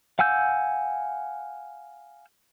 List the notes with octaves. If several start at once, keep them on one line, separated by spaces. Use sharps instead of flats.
F5 F#5 G#5 E6 G6